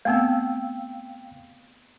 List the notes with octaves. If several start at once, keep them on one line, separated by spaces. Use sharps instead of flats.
A3 B3 C4 F5 G5 E6